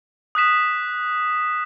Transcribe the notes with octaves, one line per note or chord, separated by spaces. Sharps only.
D#6 F#6 B6 E7